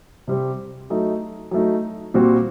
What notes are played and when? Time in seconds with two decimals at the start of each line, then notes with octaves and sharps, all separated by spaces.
0.28 C3 G3 C4 G4
0.90 F#3 A3 D#4
1.51 F#3 A3 D#4
2.14 A#2 G3 C4 F#4